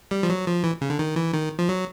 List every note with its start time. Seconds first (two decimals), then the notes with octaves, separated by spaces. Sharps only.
0.11 G3
0.23 F3
0.29 F#3
0.46 F3
0.64 E3
0.81 C#3
0.90 D3
0.99 D#3
1.16 E3
1.33 D#3
1.59 F3
1.69 F#3